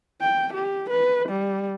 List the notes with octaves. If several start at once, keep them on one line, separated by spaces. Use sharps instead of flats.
G5
G4
B4
G3